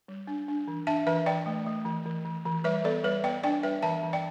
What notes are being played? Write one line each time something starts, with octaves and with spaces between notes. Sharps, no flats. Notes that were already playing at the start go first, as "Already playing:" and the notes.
G3
D4
D4
E3
D4 E5 A5
E3 B4 E5
E3 D5 G5
A3
A3
E3
E3
E3
E3
G3 B4 E5
B3 A4 D5
G3 B4 E5
B3 D5 G5
D4 D5 G5
G3 B4 E5
E3 E5 A5
E3
D5 G5